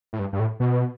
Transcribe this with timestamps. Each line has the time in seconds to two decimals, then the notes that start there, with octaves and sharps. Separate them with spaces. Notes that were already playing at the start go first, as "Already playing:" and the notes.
0.13 A2
0.19 G2
0.33 G2
0.40 A2
0.60 B2